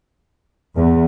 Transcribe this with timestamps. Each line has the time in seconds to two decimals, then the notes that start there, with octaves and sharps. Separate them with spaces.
0.75 E2